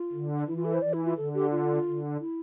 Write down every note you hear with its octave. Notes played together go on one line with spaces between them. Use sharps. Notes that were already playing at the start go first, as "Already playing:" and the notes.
Already playing: F4
D3
E3 E4
F4
A4
C5
E3 D5
E4
F4
D3 A4
G4
F4
D3
E4